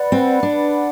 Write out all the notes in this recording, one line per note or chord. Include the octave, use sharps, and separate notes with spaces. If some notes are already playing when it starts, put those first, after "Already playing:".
Already playing: B4 D5 F#5 B5
C4
D4